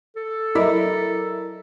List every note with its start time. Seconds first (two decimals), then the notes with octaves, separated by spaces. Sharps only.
0.16 A4
0.55 F#3 E4 A#4 D5 D#5